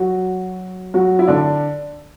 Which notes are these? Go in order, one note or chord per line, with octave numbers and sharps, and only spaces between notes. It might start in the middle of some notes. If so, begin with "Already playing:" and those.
Already playing: F#3 F#4
F#3 F#4
E4
D3 D4